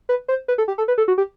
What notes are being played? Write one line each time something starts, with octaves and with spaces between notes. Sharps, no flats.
B4
C5
B4
A4
G4
A4
B4
A4
F#4
G4